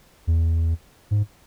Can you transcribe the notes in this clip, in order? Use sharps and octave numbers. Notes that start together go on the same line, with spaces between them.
E2
G#2